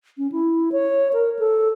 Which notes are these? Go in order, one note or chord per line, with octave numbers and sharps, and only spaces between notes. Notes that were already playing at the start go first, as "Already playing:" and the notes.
C#4
E4
C#5
A#4
A4